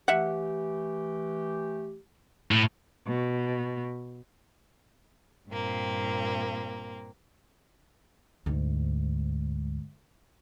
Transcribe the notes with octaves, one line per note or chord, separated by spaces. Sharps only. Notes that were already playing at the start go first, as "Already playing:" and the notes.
E3 A3 G4 E5 F#5
A2
B2
G2 A#2 A#3 C4
D2 G#2